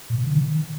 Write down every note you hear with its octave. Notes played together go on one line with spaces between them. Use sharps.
A#2
B2
D3
D#3